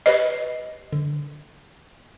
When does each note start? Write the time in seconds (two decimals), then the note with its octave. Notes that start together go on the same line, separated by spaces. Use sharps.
0.06 G4 B4 C#5 D#5
0.92 D3